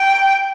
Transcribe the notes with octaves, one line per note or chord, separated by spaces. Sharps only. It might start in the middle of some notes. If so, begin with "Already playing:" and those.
Already playing: G5